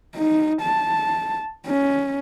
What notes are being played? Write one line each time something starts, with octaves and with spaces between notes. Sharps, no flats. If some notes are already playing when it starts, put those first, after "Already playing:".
D#4
A5
C#4